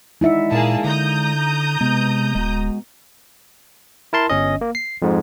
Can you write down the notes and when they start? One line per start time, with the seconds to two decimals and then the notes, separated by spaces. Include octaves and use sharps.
0.21 G#3 D#4 E4 D5 E5 F#5
0.52 A#2 A#3 G#4 A5
0.84 D3 A#5 D#6 G6
1.81 C3 G#3 B3
2.35 D1 G#3 F#4
4.13 E4 A#4 A5 C6
4.29 G1 C#4 D#5
4.61 A#3
4.75 C7
5.02 F2 G#2